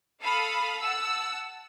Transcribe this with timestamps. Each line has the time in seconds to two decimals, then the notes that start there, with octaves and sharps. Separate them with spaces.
0.23 A4 F5 B5 D#6
0.79 F#5 A5 E6